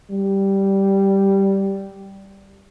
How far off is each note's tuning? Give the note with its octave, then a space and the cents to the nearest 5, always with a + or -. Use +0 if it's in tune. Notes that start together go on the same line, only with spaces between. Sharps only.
G3 -5